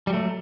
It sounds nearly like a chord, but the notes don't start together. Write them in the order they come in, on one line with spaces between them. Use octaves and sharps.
G3 F#3 A3